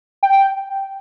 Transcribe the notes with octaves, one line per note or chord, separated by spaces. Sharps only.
G5